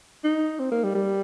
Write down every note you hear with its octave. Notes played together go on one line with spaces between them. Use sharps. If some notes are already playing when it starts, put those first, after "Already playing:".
D#4
C4
A#3
G3
G3